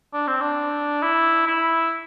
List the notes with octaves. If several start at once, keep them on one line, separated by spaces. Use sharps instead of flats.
D4
C4
D4
E4
E4